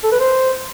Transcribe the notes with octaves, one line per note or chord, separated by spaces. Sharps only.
A4
B4
C5